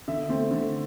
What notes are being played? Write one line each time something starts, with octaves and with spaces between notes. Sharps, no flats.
D3 E5
A3 C4
D3